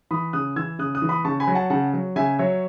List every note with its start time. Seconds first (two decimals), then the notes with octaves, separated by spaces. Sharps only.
0.11 E3 B5 D#6
0.33 C#3 D#6 F#6
0.56 E3 E6 G#6
0.79 C#3 D#6 F#6
0.95 D#6 F#6
1.02 E3
1.09 B5 D#6
1.24 C#3 A5 C#6
1.40 G#5 B5
1.47 F#3
1.55 F#5 A5
1.70 C#3 F#5 A5
1.94 F#3
2.16 C#3 E5 G#5
2.39 F#3 C#5 E5